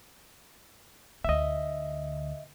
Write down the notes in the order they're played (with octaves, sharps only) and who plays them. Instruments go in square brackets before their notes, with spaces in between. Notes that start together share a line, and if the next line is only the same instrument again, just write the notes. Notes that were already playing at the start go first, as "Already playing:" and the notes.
[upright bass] D2 D3 [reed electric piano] D#5 E5